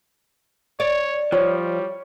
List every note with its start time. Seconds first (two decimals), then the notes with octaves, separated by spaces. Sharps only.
0.80 C#5 D5
1.32 F3 G3 C#5